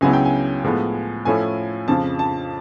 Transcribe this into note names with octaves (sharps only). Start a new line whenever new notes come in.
C#2 C#3 F#3 B3 E4 G#5
G5
G#5
A2 F3 G#3 B3
A2 F3 A3 C#4 E4 G#5
F2 C#3 F3 A5
A5